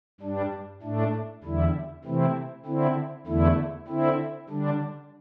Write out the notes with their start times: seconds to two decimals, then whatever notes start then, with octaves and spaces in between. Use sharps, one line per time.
0.20 G2 G3 D4
0.82 A2 A3 D4
1.44 E2 D3 G3 E4
2.05 C3 E3 A3 C4 E4
2.66 D3 C4 E4
3.27 E2 D3 A3 E4
3.88 D3 C4 E4
4.49 D3 G3 D4